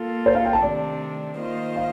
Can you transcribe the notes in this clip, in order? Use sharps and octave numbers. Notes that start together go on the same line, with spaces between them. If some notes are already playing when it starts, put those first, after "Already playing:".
Already playing: A#3 F4 A4
C5
F5
G5
A5
C3 D#3 A3 D4 D5
D#3 A#3 F4 C5 D#5
F5